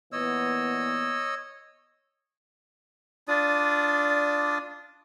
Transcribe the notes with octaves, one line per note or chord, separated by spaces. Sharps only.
A#2 E3 B3 C#5 D#5 E6
D4 F4 D5 D#6